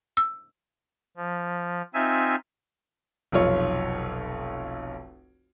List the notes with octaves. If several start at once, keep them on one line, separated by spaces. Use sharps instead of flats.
E6
F3
C4 D#4 F4 E5 G#5
F1 B1 F4 C#5